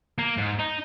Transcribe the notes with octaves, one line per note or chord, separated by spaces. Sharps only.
A#3
G#2
D#4